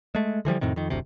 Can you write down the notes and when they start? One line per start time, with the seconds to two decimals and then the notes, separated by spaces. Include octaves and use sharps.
0.15 G#3 A3
0.45 D3 E3 F3 G3
0.61 F2 A2 C3 D#3
0.76 F2 D#3
0.90 F#1 D2 C3